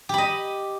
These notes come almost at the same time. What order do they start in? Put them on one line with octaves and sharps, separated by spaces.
G4 B5 D#5